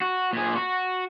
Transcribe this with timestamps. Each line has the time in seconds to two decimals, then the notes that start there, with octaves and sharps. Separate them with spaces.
0.01 F#4
0.33 A#2 G#4
0.56 F#4